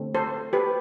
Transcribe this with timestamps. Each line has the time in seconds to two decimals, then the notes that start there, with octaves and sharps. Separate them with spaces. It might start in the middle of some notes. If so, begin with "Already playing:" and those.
Already playing: D3 A3 C4
0.15 A4 C5
0.53 G4 B4